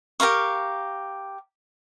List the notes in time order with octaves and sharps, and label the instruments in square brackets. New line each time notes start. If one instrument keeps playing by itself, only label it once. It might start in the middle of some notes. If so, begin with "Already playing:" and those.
[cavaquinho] G4 A#4 F5 C#6